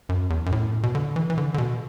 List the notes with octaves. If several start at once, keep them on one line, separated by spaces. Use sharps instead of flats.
F#2
E2
F#2
A2
B2
D3
E3
E3
D3
D3
B2